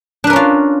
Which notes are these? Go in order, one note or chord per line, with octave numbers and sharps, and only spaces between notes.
C#4 D4 F4 A#4 B4